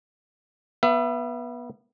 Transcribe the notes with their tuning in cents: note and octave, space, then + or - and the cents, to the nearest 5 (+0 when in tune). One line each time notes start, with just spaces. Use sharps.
B3 -20 E5 +30